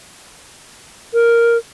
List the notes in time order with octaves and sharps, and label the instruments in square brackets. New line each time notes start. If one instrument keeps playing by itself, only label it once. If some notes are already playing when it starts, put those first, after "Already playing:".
[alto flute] A#4